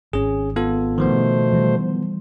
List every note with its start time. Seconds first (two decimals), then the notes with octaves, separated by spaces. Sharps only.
0.13 G#1 C#4 G#4
0.56 B3 F4 A4
0.98 B2 D#3 F3 A3 B3 C5
1.53 E3 G3